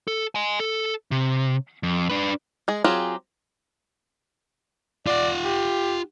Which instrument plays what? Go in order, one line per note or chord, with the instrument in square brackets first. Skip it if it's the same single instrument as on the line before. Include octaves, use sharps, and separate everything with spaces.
[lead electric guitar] A4
D#5 G#5
A4
C3
F2
D4 B4
[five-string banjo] G#3 G#4
F#3 C4 F4 G4 G#4
[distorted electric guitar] F4 F#5 [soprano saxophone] D5
[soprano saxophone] G4